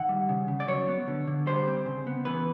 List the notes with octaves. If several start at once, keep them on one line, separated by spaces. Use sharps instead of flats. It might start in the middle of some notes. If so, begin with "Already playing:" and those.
Already playing: D#3 F#5
G3
C#3
C#3
D5
F#3 C#5
B3
D3
D3
G3 C5
C4
C#3
B3
E3 B4